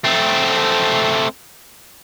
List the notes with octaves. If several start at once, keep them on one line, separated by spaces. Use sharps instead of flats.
A3 C4